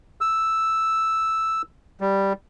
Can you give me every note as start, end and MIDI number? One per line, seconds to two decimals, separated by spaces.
0.21 1.62 88
2.01 2.33 55